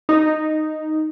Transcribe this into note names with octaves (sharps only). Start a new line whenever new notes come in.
D#4